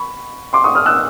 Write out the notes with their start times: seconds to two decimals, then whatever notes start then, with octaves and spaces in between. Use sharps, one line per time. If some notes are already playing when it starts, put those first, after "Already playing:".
Already playing: B5 C#6
0.53 C6 D6
0.64 C#6 D#6
0.75 D#6 F6
0.86 E6 F#6